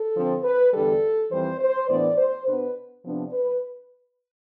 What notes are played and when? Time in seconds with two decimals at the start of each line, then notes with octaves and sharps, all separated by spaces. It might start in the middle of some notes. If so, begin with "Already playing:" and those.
Already playing: A4
0.15 D3 F3 C4
0.44 B4
0.73 E2 D3 G3 A4
1.31 F2 E3 G3 C4 C5
1.60 C5
1.88 A2 E3 B3 D4 D5
2.17 C5
2.46 B2 B3 D4 B4
3.04 C3 F3 B3 D4
3.33 B4